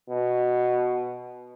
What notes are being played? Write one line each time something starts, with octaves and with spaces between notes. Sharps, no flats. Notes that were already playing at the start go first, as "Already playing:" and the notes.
B2